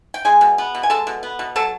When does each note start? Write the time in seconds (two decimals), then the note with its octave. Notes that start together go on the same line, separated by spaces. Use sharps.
0.14 G5
0.25 G#3 G#4 G#5
0.41 B2
0.58 B3
0.75 B2
0.83 G#5
0.90 G#3 A4 A5
1.07 B2
1.23 B3
1.39 B2
1.56 F#3 A4 A5